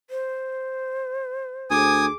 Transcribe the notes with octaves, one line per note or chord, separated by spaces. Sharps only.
C5
D2 G#4 G#5 D6 D#6